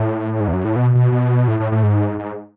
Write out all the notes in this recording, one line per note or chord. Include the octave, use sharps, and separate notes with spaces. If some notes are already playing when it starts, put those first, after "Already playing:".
Already playing: A2
G#2
E2
F#2
A2
B2
B2
B2
A2
A2
A2
G#2
G#2